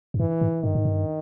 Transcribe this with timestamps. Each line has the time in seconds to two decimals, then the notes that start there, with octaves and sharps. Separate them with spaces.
0.14 F#2
0.20 G2 E3
0.41 G#2
0.63 G2 D#3
0.75 G#2
0.85 G2